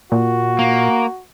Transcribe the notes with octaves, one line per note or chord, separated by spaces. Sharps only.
A#2 F#4
A#3